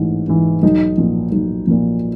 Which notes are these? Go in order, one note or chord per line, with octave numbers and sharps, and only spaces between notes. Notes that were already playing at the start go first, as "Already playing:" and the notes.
Already playing: A1 G#2 E3
G#2 E3
B1 D#4
A#2 F3
B1
A#2 F3